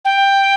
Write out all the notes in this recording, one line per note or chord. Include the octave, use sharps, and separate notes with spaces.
G5